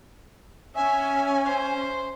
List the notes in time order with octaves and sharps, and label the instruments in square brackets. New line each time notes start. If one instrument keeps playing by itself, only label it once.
[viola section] C#4 [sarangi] E5 [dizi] G#5
[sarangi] C5